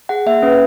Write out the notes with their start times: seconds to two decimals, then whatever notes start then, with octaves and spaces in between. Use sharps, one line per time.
0.09 G#4 F#5
0.26 A#3 E5
0.42 C#4 B4